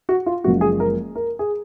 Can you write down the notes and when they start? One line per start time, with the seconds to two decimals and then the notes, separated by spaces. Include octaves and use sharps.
0.09 F#4
0.26 F4
0.44 F#1 F#2 F3 G#3 F#4
0.61 G#4
0.80 A#4
1.16 A#4
1.39 G#4